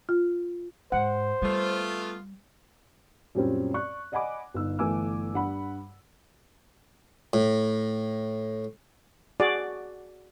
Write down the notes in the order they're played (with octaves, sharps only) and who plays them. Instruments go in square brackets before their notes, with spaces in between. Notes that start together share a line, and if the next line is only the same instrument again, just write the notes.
[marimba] F4
[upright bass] G#2 [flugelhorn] C5 [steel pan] F#5
[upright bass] G3 [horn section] A3 B3 F4
[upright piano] F#2 A#2 G3 C4 C#4
D5 C#6 F#6
D5 D#5 F#5 G#5 B5 D6
G1 D#4 E6
G1 E3 A3 G#5 D6 E6
G2 F#5 B5
[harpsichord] A2
[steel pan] F#4 G#4 D5